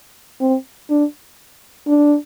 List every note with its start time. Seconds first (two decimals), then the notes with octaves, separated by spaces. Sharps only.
0.40 C4
0.90 D4
1.87 D4